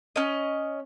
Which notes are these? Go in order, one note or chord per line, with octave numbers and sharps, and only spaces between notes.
C#4 D#5